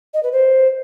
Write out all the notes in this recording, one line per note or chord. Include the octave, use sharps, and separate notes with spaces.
D#5
B4
C5